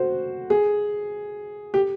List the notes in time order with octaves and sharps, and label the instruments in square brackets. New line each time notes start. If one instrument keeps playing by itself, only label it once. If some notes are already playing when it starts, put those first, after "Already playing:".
Already playing: [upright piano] F#4 C5
G#4
G4